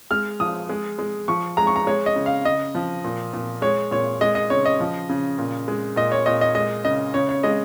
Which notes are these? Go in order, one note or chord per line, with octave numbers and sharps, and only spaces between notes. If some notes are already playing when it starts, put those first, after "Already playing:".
G#3 F6
F3 D#6
G#3
G#3
F3 C#6
G#3 A#5
C#6
A#5
G#3 C#5
D#5
C#3
F5
C#3 D#5
F3
A#2
A#2
G#3 C#5
A#2 C#5
G#3 D#5
D#5
C#3 C#5
D#5
F3
C#3
A#2
G#3
A#2 D#5
C#5
A#2 D#5
D#5
G#3 D#5
C#3 D#5
C#3 C#5
C#5
G#3 D#5